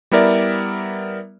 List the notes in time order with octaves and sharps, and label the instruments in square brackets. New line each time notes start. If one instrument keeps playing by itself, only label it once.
[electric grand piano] G3 B3 E4 A#4 D5 E5